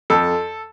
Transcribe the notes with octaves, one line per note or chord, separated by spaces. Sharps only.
F2 A4